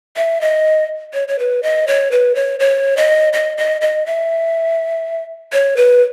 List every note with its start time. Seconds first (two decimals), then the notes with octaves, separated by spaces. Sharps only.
0.16 E5
0.41 D#5
1.14 C#5
1.28 C#5
1.39 B4
1.63 D#5
1.87 C#5
2.11 B4
2.35 C#5
2.60 C#5
2.97 D#5
3.33 D#5
3.58 D#5
3.81 D#5
4.06 E5
5.53 C#5
5.77 B4